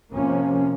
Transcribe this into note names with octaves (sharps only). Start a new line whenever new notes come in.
C3 F3 A#3 C#4